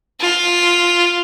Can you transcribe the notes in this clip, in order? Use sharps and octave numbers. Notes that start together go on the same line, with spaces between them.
F4